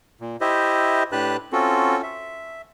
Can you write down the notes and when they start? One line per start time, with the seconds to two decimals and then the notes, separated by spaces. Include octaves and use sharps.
0.21 A#2
0.41 E4 G4 C5 D#5 E5
1.12 A2 D4 G4 B4 A5 F#6
1.53 C4 C#4 F4 F#4 A4
2.03 E5